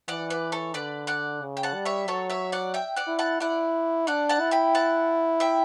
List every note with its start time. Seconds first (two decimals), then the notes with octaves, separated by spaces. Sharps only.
0.08 E3 D5 F#5
0.30 B4 D5
0.52 A4 C#5
0.74 D3 B4 D5
1.07 D5 F#5
1.42 C#3
1.57 G5
1.63 F#5 A5
1.75 G3
1.85 C#5 E5
2.08 F#3 A4 C#5
2.30 C#5 E5
2.52 D5 F#5
2.74 E5 G5
2.96 D5 F#5
3.07 E4
3.19 F#5 A5
3.40 E4 D5 F#5
4.07 D4 D5 F#5
4.29 F#5 A5
4.40 E4
4.51 G5 B5
4.75 F#5 A5
5.40 E5 G5